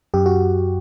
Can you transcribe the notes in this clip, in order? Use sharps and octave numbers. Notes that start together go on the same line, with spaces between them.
F#2 G4
F#4